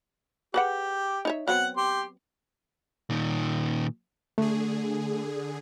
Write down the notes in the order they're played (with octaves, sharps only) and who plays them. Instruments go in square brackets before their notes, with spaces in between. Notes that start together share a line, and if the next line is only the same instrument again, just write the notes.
[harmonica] G4 [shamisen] G#4 B4 F#5
[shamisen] D#4 C#5 E5
[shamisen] F#3 B3 C4 [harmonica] F#5
[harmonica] G4 C6
[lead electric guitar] A#2 D#3
[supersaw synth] D3 G#4 [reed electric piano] A3